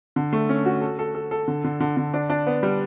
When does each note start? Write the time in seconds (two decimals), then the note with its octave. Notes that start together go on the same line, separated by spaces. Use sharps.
0.16 D3
0.33 A3
0.49 C#4
0.66 F#4
0.81 A4
0.99 A4
1.15 A4
1.31 A4
1.48 D3
1.64 D3
1.80 D3
1.97 D3
2.14 D4
2.30 D4
2.46 B3
2.63 G3